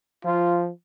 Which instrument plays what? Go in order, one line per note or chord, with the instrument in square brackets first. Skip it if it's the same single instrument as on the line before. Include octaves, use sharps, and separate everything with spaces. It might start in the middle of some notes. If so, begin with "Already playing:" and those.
[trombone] F3 [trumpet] F4